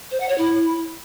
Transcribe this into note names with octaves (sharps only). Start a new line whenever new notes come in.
C5
F#5
C#5
E4